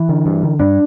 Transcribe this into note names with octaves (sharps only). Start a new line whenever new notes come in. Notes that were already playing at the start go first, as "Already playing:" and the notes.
Already playing: E3
D3
G2
D3
G2 D4